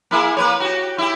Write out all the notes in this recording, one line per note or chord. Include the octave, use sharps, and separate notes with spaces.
A#3 E4 G#4
A#3 B4 C#5
F#4 G4
E4 G4